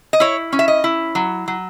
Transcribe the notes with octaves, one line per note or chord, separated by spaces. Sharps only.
D#5
E4 C#5
C#4
E5
D#5
E4
F#3
F#3